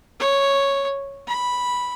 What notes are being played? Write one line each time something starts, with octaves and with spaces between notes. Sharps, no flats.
C#5
B5